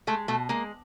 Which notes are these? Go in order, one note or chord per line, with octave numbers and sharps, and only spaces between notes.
G#3 A3
B2 A3
G#3 A#3